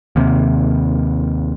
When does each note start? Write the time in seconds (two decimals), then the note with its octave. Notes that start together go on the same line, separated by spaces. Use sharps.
0.16 D#2 C3